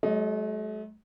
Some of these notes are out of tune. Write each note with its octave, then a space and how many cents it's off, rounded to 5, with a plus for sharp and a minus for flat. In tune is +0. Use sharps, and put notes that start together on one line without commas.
F#3 +35 A3 -45 D#5 +5